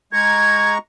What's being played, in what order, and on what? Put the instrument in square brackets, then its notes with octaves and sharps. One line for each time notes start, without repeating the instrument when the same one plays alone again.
[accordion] G#3 A#5 C#6 [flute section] G#6